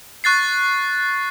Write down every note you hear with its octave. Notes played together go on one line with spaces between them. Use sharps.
C#6 F#6 A6 C7